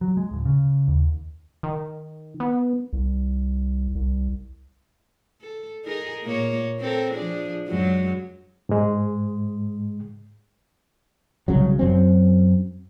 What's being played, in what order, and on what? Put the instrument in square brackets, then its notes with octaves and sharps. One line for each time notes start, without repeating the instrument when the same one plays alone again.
[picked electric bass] F#3
G#3
D1
C#3
D#2
[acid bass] D#3
B3
[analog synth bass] C2
C2
[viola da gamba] A4
D#4 G#4 A#4
A#2 A#3 C#5
C4 A4 A#4
F3 D4 G#4
F#2 F#3 G#3
[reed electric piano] G#2 G#3
[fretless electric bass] C2 C#3 F#3
F#2 F#3 C4